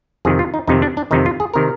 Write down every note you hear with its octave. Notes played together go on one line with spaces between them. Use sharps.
F2 C3 D#3 G#4
F4
D#4
F2 C3 D#3 D#4
D4
D4
F2 C3 D#3 D#4
F4
G#4
C3 D#3 A#4